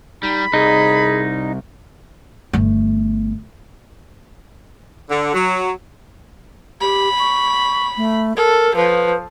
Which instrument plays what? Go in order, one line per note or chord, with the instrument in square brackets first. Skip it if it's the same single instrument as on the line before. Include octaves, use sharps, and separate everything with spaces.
[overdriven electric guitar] G3 [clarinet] D#4 [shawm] B5
[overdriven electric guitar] C2 [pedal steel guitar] D#4 [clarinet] G#4
[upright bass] G1 A3
[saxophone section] D3
F#3
[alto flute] G4 [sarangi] B5
[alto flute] C#6
A3
[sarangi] A4 [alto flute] A#4
[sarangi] F3 [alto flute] B4